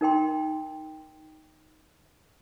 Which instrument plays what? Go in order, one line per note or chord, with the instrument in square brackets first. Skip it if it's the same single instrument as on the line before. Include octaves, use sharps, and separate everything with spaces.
[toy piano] D#4 A#4 G5 C6